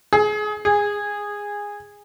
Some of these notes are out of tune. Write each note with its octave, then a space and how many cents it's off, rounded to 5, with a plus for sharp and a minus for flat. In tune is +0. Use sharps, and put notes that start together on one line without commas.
G#4 +25
G#4 -15